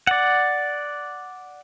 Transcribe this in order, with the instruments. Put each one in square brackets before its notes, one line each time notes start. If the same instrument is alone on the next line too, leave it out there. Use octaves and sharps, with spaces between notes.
[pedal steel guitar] D5 F#5